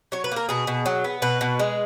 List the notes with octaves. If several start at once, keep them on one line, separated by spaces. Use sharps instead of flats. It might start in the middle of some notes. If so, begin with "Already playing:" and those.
F#3 C#5
B4
A#3 A#4
B2 G#4
B2
F#3
B3
B2 B4
B2
G#3